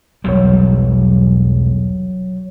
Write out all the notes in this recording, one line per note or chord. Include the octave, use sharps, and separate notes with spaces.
E1 B1 F#3 G3 C#5